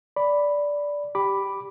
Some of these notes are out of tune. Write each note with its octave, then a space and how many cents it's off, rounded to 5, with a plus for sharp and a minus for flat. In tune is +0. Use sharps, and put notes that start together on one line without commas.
D5 -10 B5 +0
G4 +0 B5 +0 D6 +0